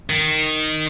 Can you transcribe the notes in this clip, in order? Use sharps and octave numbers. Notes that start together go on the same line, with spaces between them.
D#3